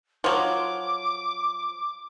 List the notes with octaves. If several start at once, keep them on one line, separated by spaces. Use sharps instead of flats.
F3 F#3 D6